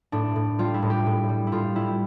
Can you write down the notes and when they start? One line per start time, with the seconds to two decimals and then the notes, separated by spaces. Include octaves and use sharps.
0.12 A2 D4
0.36 A2
0.59 G3 F4
0.74 E4
0.82 A2
0.90 G4
1.06 A2
1.29 G3
1.47 E4
1.52 A2 F4
1.75 G3 E4